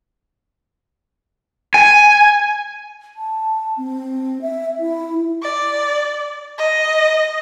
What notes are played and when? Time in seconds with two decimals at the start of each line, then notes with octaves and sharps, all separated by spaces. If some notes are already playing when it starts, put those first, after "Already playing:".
1.74 G#5
3.16 A5
3.77 C4
4.42 E5
4.79 E4
5.42 D5
6.58 D#5